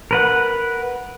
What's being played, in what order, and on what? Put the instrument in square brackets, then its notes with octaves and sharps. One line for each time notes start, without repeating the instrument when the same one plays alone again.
[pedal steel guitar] A#4 B4 F#5